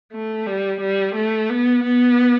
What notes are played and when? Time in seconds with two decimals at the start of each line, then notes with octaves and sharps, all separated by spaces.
0.13 A3
0.47 G3
0.81 G3
1.15 A3
1.50 B3
1.83 B3